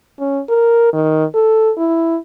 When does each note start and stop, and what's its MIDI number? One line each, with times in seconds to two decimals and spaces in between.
0.20 0.41 61
0.49 0.92 70
0.93 1.25 51
1.34 1.72 69
1.78 2.18 64